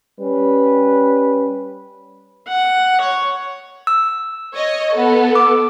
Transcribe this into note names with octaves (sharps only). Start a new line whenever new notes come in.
G3 C#4 B4
F#5
C#5
E6
C#5 D#5
B3 A4
D6 E6